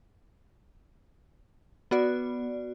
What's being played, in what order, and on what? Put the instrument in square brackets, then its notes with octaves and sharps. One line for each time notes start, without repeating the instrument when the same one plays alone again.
[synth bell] B3 F#4 D5